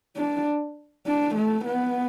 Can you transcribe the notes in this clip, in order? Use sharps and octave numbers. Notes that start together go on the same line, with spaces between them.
D4
D4
A3
B3